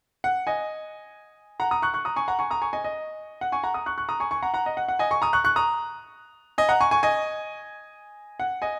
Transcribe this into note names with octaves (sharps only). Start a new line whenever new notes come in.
F#5
D#5 G#5
F#5 A#5
A#5 D#6
C#6 F#6
C#6 F#6
A#5 D#6
G#5 C#6
F#5 A#5
G#5 C#6
A#5 D#6
G#5 C#6
D#5 G#5
D#5
F#5
G#5 C#6
F#5 A#5
A#5 D#6
C#6 F#6
C#6 F#6
A#5 D#6
G#5 C#6
G#5 C#6
F#5 A#5
F#5 A#5
D#5
F#5
F#5
D#5 G#5
G#5 C#6
A#5 D#6
C#6 F#6
C#6 F#6
A#5 D#6
D#5 G#5
F#5 A#5
G#5 C#6
G#5 C#6
D#5 G#5
F#5
D#5 G#5